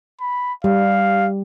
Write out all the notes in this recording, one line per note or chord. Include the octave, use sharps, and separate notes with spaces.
B5
G3 F5